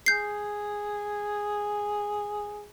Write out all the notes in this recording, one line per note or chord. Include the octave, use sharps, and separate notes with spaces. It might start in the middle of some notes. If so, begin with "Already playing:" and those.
G#4 G6 C7